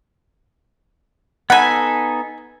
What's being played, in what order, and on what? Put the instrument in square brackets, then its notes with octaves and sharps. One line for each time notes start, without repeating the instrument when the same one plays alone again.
[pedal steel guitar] B3 D#4 A4 [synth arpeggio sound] F#5 F#6 [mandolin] G#5 B5